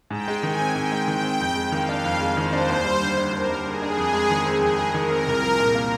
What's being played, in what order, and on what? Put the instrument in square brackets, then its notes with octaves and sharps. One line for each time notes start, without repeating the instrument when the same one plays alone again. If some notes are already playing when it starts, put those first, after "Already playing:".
[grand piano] G#2 [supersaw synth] G5
[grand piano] G#3
[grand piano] D#3 [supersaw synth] G#5
[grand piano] C4
[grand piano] G#2 [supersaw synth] G5
[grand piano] G#3
[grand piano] D#3 [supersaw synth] G5
[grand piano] C4
F2
G#3
[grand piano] D#3 [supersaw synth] F5
[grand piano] D4
F2
G#3
[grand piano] D#3 [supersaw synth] C5
[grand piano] D4
D#2
G3
D3
D4
[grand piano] D#2 [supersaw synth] A#4
[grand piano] G3
[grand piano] D3 [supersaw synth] G#4
[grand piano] D4
F2
G#3
D#3
C4
[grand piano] F2 [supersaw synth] G#4
[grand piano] G#3
[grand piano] D#3 [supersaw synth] A#4
[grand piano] C4
C2
F3
A#2
A#3